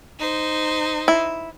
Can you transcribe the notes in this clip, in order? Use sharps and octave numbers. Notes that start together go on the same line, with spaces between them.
D#4 C5
E4